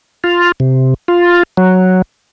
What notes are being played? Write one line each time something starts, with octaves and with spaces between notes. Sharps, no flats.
F4
C3
F4
F#3